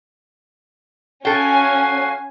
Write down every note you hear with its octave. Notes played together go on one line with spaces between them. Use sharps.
C#4 F#4 A4 F5 G5 G#5